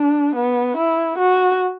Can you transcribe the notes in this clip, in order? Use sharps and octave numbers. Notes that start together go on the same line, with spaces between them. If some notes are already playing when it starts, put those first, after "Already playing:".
Already playing: D4
B3
E4
F#4